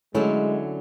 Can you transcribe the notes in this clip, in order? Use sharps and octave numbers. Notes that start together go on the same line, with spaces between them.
D3 F#3 G#3 A3 C#4 E4